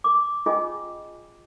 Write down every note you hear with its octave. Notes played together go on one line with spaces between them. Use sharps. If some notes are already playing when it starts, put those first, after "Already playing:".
D6
C#4 F4 G#4 D#5 G#5 D6